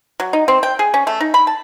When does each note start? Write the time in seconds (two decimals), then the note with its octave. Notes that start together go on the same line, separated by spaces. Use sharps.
0.20 F#3
0.33 D#4
0.48 C4
0.63 G5
0.79 G#4
0.94 C#4
1.07 A3
1.20 D#4
1.34 B5
1.47 A5